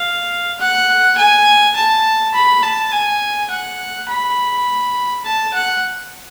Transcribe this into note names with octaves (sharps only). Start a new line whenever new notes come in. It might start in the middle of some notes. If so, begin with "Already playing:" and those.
Already playing: F5
F#5
G#5
A5
B5
A5
G#5
F#5
B5
A5
F#5